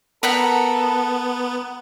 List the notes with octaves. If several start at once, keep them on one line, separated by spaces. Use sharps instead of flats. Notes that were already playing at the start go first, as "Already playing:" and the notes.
B3 A4 A#4 F#5 B5